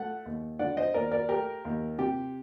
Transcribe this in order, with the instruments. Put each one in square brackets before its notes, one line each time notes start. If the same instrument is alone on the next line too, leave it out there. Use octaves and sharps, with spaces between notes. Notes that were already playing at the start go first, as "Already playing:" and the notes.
Already playing: [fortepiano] A3 F#5
D#2
D3 D5 F#5
C5 D#5
D#2 A#4 D5
A#4 D5
A3 G4 A#4
D#2
C3 G4